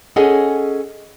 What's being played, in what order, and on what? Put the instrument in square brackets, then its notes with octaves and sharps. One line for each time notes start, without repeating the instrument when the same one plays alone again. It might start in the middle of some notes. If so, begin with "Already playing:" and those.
[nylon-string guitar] C#4 G#4 A4 D#5 F#5